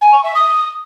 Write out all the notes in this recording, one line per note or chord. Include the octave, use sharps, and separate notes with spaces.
G#5
C#6
E5
D#6